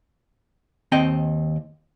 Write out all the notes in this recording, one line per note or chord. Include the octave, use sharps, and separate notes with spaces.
D#2 C4 D#5 G5